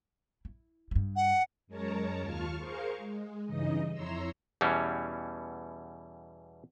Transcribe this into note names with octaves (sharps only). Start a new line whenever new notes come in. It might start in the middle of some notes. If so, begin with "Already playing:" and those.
E4
G2 G3
F#5
F#2 G#3 A#4 C#5 A5 A#5
D#2 F4 A5 C#6 F6
G#4 A#4 C5 F5 C#6
G#3
G2 C#3 E3 D#4 D#5
F2 E4 C#5 A#5 C6 E6
E2 B2 E3 G3 C#4